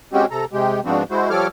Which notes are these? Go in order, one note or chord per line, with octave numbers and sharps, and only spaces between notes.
G#3 C4 C#4 F#4 G4
C3 A4 A#5
C3 G#3 G4
G#2 F3 B3 C4 D4 F#4
G#3 E4 F#4 C5
F3 G3 A4 C#5 D6 F6